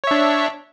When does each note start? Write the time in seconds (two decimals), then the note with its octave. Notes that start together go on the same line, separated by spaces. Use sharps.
0.04 C#5
0.07 E5
0.11 D4